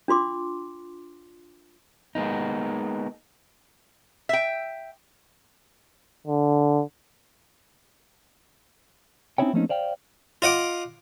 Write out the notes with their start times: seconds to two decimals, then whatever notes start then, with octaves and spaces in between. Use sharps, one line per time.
0.08 D4 F4 C6 D6
2.15 G#3 A#3 B3 D#4
4.29 E5 G5
6.27 D3
9.38 C4 C#4 D#4 E4 C#5 G5
9.53 F3 A3 A#3 C4 C#4 D#4
9.69 C5 D5 F5 G5
10.42 F4 D#5 F#5 D6